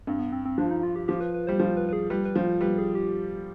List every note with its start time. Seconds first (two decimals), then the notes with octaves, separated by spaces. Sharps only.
0.07 G2 C4
0.19 B3
0.32 C4
0.45 C4
0.58 F3 D4
0.71 D#4
0.83 F4
0.96 G4
1.08 F3 G4
1.21 B4
1.34 B4
1.47 G3 C5
1.59 F3 C5
1.77 B4
1.89 B4
1.93 G#4
2.10 G3 B4
2.25 B4
2.36 F3 C5
2.61 G3 B4
2.78 G#4
2.95 G4